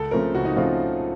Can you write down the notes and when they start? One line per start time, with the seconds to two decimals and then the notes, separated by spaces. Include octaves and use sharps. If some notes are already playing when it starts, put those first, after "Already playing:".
Already playing: C#2 A4
0.11 C#3 F3 A3 C4 A#4
0.34 C#2 F#4
0.45 D#4
0.56 C#3 F3 A3 C4 F4